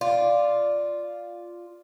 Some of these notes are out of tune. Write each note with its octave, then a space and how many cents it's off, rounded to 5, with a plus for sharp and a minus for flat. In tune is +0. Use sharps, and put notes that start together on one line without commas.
F4 +0 D5 +0